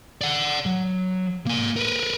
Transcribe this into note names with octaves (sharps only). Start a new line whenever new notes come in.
D5 F#5
F#3
A#3 G#5
A#4 B4